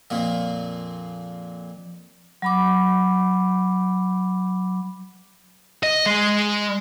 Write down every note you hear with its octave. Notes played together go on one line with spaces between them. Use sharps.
F2 A#2 A#3
F#3 B5 D6
D#5
G#3